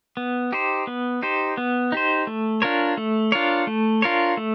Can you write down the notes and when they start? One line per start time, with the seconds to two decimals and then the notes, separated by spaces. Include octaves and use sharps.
0.17 B3
0.52 D#4 G4 C5
0.87 B3
1.22 D#4 G4 C5
1.57 B3
1.92 D#4 G4 C5
2.27 A3
2.62 D4 F4 A#4 C#5
2.97 A3
3.32 D4 F4 A#4 C#5
3.67 A3
4.02 D4 F4 A#4 C#5
4.37 A3